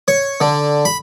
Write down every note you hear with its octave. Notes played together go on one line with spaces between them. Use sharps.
C#5
D3
B5